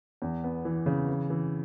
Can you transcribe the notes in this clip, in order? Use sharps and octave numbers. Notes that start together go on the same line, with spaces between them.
E2
B3
E3
C#3
E3
E3